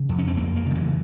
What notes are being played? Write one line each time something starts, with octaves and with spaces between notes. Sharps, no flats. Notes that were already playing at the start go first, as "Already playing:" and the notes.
Already playing: C#3
F2
C#4
C4
F2 A#3
A#3
C#3 F3
E3